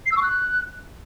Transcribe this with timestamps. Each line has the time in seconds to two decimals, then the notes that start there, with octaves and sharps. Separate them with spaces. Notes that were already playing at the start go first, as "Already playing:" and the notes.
0.06 C7
0.11 E6
0.17 C#6
0.22 F#6